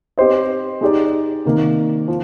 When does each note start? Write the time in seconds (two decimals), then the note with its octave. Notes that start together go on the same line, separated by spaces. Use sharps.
0.18 C4 G4 C5 D#5
0.81 G#3 D#4 G4 D5
1.45 C3 D#3 A#3
2.08 F3